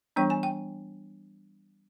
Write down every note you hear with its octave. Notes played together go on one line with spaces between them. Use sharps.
E3 G3 B3 D4 G5
G#5
G5